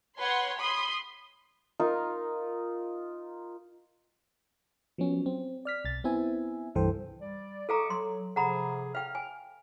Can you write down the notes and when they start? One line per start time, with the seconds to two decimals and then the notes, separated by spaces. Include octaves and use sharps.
0.18 B4 C#5 F#5 C6
0.60 B5 C6 D#6
1.80 D#4 F4 A#4
4.98 F3 F#3 B3 C#4
5.26 C4
5.65 D5 F6 B6
5.85 B1 A6
6.04 B3 C4 E4 E5 G#5
6.75 C2 G2 E3 A4 C5 G5
7.21 G3 D5
7.69 A4 D#5 F5 A#5 C#6 D6
7.90 F#3 C6
8.36 C3 F3 G#4 F#5 A#5 B5
8.95 F5 G5 F6
9.15 G#5